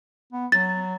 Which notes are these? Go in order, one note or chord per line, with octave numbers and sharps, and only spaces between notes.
B3
F#3 A6